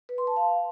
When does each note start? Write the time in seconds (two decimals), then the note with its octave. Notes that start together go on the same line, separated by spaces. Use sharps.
0.09 B4
0.18 C6
0.27 A5
0.36 F5